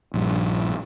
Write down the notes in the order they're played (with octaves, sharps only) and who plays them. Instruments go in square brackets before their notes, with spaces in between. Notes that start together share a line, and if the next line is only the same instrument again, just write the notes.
[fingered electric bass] A#1 G2